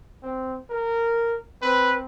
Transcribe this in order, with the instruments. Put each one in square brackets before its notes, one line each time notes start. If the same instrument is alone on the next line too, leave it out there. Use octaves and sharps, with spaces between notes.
[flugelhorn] C4
A#4
[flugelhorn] C4 [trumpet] B4